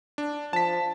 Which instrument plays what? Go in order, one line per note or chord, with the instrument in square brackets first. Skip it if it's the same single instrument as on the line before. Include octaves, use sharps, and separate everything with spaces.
[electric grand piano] D4
[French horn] F3 [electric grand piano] A5 B6